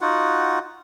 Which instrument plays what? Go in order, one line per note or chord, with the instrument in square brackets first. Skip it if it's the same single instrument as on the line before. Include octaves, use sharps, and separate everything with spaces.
[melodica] D#4 F4 F#4 F#5